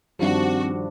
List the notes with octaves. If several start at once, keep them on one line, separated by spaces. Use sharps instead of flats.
G2 D#3 F3 C4 D4 F#4